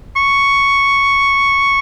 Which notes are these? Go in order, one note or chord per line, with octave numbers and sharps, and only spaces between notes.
C#6